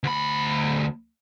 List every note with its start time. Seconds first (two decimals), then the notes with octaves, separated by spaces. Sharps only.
0.03 D2 B5